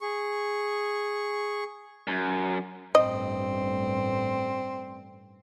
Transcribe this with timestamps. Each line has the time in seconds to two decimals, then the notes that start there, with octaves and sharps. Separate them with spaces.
0.01 G#4 C#6
2.07 F#2
2.95 A1 G2 C4 D#5